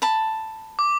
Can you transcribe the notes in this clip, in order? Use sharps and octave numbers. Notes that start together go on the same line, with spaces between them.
A5 B5
D6